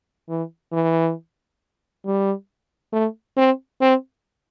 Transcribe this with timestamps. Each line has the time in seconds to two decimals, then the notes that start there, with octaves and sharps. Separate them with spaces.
0.29 E3
0.73 E3
2.06 G3
2.93 A3
3.37 C4
3.81 C4